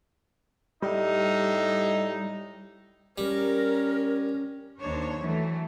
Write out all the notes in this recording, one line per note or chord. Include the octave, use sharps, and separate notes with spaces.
A2 G3 D#4
G3 C#4 A#4
D#2 D4 C5 C#5
E3 F#3 A3